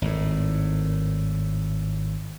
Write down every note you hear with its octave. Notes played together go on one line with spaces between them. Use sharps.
G#1 A2